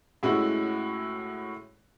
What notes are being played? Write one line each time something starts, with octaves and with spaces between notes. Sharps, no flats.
A2 G#3 C#4 E4 F#4